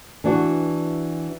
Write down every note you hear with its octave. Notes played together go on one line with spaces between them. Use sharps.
E3 D4 F#4